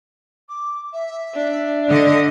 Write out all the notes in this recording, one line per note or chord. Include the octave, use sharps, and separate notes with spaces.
D6
E5
D4
D3 D#5